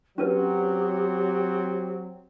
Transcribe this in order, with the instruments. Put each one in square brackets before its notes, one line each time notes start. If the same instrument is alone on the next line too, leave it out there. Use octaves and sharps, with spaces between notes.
[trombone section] F#3 C4 [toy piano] C#4 A#4 B4 [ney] G4